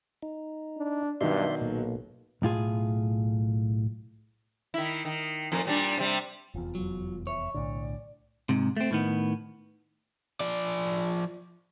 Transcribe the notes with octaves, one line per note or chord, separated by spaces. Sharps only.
D#4
D4
G2 B2 D#3 F#3 D5 E5 C6
B1 A#2 A#3
B1 A2 F4 G#4
D#3 E4
D#3
F2 A#2 A#3
A#2 G3 D4
C3 G3
F1 E2 F4
F#3
C#5 E5
B1 A2 D3 D5
G#2 C3
A3 C4
A2 D#3 B3
F3 D5